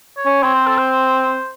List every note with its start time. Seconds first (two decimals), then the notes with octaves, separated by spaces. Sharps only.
0.17 C#5
0.26 C#4
0.43 C4 C#5
0.55 C5
0.67 A4
0.78 C5